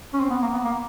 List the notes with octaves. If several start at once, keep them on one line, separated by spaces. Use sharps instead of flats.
C#4
C4
B3
A#3
B3
A#3